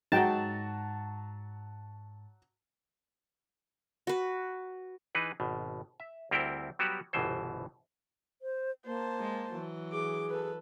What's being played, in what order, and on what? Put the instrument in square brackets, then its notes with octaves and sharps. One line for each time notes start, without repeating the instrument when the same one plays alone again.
[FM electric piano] G#2 A5 [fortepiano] F#3 F#4 [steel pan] D#4 G5
[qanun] F#4 B4
[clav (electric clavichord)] E3 D#4 G#4 B4
G#1 B2
E5
D2 G3 C4 E4 A#4 G5
F#3 G3 B3 F#4 G4
G1 C2 B2 E3 C5
[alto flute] C5
[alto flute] A#3 [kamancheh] C5 A5
[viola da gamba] G#3
E3 F#3
[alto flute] G#4 [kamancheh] D6
[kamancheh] A4 B4